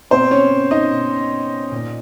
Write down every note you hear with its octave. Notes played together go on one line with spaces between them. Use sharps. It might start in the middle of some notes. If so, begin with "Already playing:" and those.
B2 C4 C5
C#4 C#5
D#4 D#5
B2
A#2